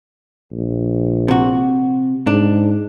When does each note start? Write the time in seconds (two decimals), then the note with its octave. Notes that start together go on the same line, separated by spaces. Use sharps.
0.52 A#1
1.28 C3 F#4
2.27 G#2 D4